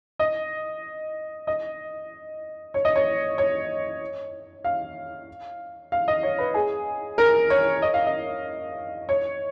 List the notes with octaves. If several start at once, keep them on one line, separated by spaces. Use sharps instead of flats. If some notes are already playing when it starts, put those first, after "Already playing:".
D#5
D#5
C#5
D#5
C#5
C#5
F5
F5
D#5
C#5
B4
G#4
A#4
C#5
D#5
F5
D#5
C#5